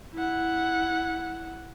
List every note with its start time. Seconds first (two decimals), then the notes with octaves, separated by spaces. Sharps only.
0.14 E4 F#5